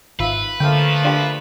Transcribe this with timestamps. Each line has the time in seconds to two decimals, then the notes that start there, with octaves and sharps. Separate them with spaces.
0.20 G#1 F4 B4 E5
0.60 D3 F3 A3 A#3 F5 G5
1.05 D4 F4 G4